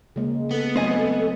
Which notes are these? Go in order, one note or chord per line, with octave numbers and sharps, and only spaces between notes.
C#3 G#3 A#3
B3 A4
F#3 A3 C4 D#5 G#5